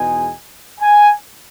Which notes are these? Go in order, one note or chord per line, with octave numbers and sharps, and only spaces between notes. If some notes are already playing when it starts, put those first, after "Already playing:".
Already playing: E2 B2 G#3 D#4 G#5
G#5